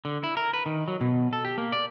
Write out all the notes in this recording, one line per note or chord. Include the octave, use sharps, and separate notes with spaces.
D3
E4
A#4
B4
D#3
F#3
B2
A4
G4
A#3
D5